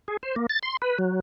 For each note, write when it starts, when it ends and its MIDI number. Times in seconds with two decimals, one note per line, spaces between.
0.08 0.17 68
0.23 0.35 72
0.36 0.46 58
0.49 0.59 93
0.63 0.77 84
0.82 0.98 71
0.99 1.20 54